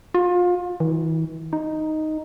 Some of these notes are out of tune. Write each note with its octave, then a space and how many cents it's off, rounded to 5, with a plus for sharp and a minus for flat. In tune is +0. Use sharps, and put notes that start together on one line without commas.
F4 +30
E3 -40
D#4 +0